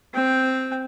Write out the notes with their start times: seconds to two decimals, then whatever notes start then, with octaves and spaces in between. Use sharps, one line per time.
0.14 C4 G5